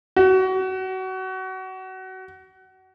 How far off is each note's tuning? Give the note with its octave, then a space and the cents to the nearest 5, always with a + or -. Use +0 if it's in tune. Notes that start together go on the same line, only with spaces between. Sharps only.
F#4 +25